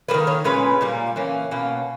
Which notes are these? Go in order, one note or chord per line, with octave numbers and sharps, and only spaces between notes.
G3 A#3 B4
D#3
C#5
A#2 G#3 C#4 B4
A#2 G3 A#3
E3 A#3 C#4
B2 A#3 C#4